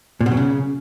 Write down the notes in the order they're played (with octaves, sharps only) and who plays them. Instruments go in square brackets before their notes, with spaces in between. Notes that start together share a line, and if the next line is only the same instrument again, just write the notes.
[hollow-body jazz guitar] A#2
B2
F#3
C#3